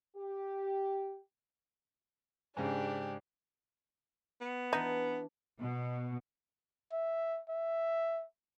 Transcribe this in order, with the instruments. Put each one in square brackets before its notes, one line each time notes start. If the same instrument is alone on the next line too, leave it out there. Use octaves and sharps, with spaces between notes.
[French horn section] G4
[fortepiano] G#2 C#3 [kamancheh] D4 G4
[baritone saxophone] B3
[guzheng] E3 D4 [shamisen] D#4
[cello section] B2
[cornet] E5
E5